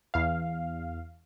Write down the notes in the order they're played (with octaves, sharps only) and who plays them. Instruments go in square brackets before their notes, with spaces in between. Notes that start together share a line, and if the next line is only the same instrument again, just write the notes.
[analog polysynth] E2 F5